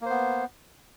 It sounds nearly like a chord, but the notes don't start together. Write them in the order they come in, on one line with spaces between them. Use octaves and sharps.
A#3 C5 B3